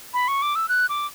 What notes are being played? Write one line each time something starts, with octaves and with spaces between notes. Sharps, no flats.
B5
C#6
D6
E6
F#6
D6